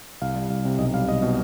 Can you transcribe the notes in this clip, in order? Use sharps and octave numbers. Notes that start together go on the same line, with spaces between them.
C2 F5
G3
C2 F5
C3
B1 D#5
G3 F5
B1 D#5
B2